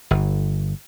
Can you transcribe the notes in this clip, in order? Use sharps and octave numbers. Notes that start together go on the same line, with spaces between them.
G1